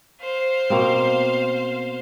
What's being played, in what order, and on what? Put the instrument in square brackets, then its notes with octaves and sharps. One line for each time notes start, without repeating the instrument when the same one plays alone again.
[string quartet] C5 F5
[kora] B2 A#3 C4